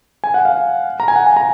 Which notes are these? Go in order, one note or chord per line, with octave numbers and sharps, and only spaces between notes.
G#5
F#5
F5
A#5
G#5
F#5
G#5
A#5